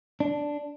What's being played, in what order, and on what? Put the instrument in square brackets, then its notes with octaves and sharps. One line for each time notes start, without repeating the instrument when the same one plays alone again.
[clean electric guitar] D4